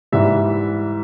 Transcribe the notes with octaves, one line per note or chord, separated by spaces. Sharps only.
G#2 E3 G3 E5